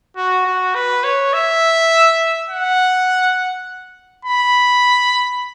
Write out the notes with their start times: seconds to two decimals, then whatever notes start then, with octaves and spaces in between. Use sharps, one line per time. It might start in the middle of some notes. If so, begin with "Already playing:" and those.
0.17 F#4
0.46 F#4
0.75 B4
1.04 C#5
1.33 E5
2.50 F#5
4.25 B5